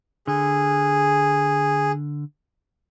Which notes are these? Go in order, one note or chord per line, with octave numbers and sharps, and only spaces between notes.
D3 G#4